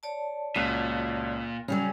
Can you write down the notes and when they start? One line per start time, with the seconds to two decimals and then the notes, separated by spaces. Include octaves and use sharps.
0.03 C#5 D5 A5
0.56 C#2 A#2 F#4 F#6 B6
1.68 C#3 F#3 G3 C#4 G#4